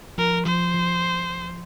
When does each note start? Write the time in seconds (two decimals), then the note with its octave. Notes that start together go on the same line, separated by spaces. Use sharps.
0.18 F3 A#4
0.46 F3 C5
0.74 F3